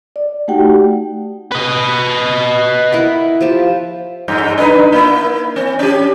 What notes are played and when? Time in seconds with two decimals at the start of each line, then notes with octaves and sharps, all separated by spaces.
0.16 D5
0.48 A3 D#4 F#4 G4 F#5 G5
1.52 B4 D#5
2.92 E4 A#4 F#5
3.41 F3 G4 A5
4.28 G2
4.58 D4 D#4 B4
4.92 A#3 E4
5.56 C4
5.79 C#4 G4